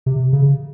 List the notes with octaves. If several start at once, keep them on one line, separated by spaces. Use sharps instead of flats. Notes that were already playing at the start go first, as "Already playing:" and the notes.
C3
C#3